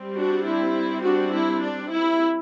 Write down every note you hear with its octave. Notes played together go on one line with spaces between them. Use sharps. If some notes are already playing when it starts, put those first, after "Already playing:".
Already playing: G3 C4
D4 F#4
E4
D4 F#4
E4
D4
E4